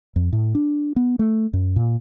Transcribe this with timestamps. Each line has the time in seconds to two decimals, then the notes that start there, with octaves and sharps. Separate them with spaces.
0.16 F2
0.33 A2
0.55 D4
0.96 B3
1.19 A3
1.53 F#2
1.76 A#2